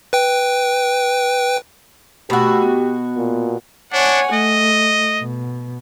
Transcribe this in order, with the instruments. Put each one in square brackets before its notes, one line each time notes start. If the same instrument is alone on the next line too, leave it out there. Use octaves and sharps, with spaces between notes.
[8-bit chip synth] B4 G5
[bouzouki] B2 F#4 [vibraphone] A3 B5 E6 [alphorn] G4
[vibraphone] B3
[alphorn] A#2
[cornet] D4 [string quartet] C#5 F#5 G#5
[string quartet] A3 [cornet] D#5
[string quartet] B2